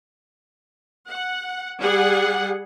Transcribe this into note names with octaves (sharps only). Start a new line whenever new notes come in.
F#5
G3 G#4 F#5